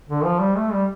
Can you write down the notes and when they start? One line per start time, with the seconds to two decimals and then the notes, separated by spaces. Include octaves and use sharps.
0.09 D3
0.25 F3
0.40 G3
0.57 A3
0.72 G3